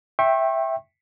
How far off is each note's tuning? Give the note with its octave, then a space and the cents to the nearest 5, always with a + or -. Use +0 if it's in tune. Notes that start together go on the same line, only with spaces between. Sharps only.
E5 +0 G5 +0 C#6 -40